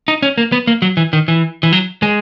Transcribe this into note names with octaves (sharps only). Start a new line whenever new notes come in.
D#4
C#4
A#3
B3
A#3
F#3
E3
D#3
E3
E3
F#3
G#3